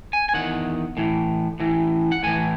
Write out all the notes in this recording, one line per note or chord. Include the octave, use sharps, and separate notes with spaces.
G#5
G#5
E2 D#3 F#5
A2 E3
A2 E3
F#5
A2 E3 G#5